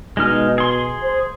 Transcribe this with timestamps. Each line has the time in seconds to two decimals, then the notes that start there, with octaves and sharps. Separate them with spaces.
0.17 B2 G#3 D#4 F6
0.58 G#4 C6
1.03 C5